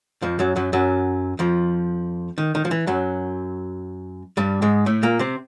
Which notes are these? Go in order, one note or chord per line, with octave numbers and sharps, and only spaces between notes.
F2 F3
F#2 F#3
F#2 F#3
F#2 F#3
F2 F3
D#3
D#3
F3
E3
F#2 F#3
G2 G3
G#2 G#3
A2 A3
A#2 A#3
C3 C4